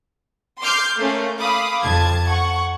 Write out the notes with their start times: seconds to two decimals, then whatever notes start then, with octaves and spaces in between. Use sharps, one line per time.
0.61 C6 D6 F6 G6 C7
0.97 A3 A#3 C#4
1.38 F5 B5 D6 D#6
1.83 F2 A5 G#6
2.28 F#5 C#6